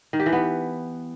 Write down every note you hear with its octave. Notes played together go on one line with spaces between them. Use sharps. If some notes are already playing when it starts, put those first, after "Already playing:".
D#3
G4
E3
B3